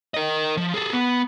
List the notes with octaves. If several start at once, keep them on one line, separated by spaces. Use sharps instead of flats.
A#4 D#5
F3
G#4 A4
B3